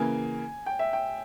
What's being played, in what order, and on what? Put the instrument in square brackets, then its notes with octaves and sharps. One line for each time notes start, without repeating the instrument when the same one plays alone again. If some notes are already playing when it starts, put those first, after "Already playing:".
Already playing: [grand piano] C#3 E3 A#3 [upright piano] G#5
[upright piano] G5
E5
G5